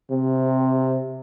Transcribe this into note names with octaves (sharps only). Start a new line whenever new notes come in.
C3